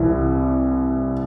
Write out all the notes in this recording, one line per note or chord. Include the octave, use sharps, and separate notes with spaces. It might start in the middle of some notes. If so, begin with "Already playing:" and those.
Already playing: C2 E3